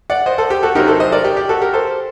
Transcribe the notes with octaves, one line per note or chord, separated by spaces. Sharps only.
D5 F#5
C5 D#5
A4 C5
G4
F#4 A4
C3 F#3 C4 D#4 G4 A#4
A4 C5
C5 D#5
A#4 D5
G4
G4
F#4 A4
G4 A#4
A4 C5